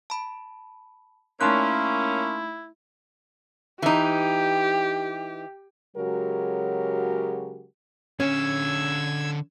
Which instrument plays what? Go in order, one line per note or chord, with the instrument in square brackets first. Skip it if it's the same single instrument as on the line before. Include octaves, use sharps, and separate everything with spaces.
[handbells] A5 B5
[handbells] A3 D#4 F#6 [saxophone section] A#3 C#4 [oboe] E4 [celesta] A5 C6
[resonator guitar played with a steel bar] E3 D#4 [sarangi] G4
[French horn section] C#3 F#3 G#3 F#4 G4 A#4
[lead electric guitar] D3 C#5 [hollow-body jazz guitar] C#4 [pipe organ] E6 G#6